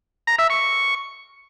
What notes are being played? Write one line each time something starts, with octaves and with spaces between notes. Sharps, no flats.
A#5
E5
C#6